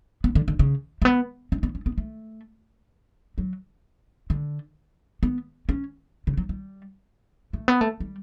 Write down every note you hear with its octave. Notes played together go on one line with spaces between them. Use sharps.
B3
D3
D3
C#3
A3
B3
C#4
B3
C#4
B3
A3
F#3
D3
B3
C#4
C#3
F#3
G3
A3
B3
A3
G3